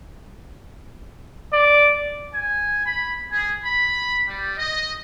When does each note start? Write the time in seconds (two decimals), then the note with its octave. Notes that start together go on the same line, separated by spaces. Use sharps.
1.53 D5
2.34 G#5
2.86 B5
3.31 G#4
3.63 B5
4.27 G3
4.57 D#5